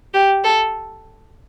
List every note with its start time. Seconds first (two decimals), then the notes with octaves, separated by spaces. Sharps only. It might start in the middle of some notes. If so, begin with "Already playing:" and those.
0.14 G4
0.44 A4